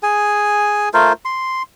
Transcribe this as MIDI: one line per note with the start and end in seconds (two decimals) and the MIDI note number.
0.03 0.89 68
0.03 0.89 80
0.94 1.13 57
0.94 1.13 65
0.94 1.13 70
0.94 1.13 72
1.25 1.63 84